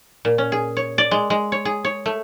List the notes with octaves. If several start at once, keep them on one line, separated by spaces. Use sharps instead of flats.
A#2
C#4
G#4
C#5
D5
G#3
G#3
C#5
G#4
C#5
A3